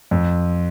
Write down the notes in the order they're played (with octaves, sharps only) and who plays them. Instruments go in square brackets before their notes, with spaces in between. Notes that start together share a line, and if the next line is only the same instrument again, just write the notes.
[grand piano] F2